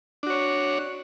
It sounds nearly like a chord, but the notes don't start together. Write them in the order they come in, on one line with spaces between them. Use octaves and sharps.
D4 F#4 C#5